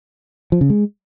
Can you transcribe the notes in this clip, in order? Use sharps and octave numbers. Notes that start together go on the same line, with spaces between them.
F3
C#3
G#3